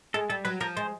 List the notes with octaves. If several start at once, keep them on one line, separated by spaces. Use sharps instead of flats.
G#3 A4
G3 A4
F#3 B4
F3 A#4
G#3 C5